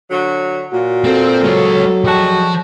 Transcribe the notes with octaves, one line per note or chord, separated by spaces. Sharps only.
D3 F#3
A#2 F#4
C4 A4
F#3 G#3 C#5
F3 G3 G#3 F#4 A5